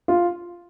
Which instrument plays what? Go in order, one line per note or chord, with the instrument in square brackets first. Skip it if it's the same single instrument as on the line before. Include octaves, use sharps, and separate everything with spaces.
[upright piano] F4